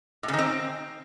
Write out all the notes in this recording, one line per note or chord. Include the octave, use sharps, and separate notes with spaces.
A2
C#3
D#3
C4